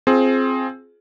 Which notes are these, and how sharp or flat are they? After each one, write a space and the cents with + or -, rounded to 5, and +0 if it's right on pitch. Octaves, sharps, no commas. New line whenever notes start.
C4 +10 F4 +0 G#4 +25